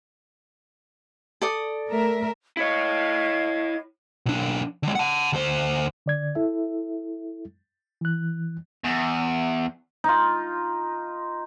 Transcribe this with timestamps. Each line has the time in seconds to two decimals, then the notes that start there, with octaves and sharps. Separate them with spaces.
1.42 A4 D5 D#6
1.89 A3 A#4 E5
2.57 E4 C#5 D#5 F5 G#6
4.26 B1 D4
4.83 D3 G#3
4.95 F#5 A5
5.33 D2 C5
6.06 D3 D5 G#6
6.35 E4 A4 E5
8.01 E3 F#6
8.85 E2
10.04 D#4 F4